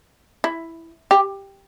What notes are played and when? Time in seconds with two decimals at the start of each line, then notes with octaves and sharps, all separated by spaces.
0.44 E4
1.11 G4